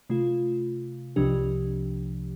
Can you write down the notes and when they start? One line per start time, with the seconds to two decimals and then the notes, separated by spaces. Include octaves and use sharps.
0.10 C3 A3 F4
1.16 C2 C3 F3 D4 G4